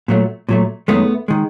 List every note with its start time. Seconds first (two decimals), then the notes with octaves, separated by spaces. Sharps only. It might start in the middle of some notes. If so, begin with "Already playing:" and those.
0.08 A#2 F#3 A3
0.49 A#2 F#3 A3
0.88 F#2 D#3 G#3 A3 B3
1.28 D#3 G#3